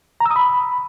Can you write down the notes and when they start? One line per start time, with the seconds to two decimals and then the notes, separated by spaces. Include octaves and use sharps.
0.20 A#5
0.26 E6
0.31 D#6
0.36 B5